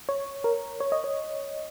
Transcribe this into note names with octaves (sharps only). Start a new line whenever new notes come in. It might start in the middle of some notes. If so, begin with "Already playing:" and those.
C#5
A#4
C#5
D#5
C#5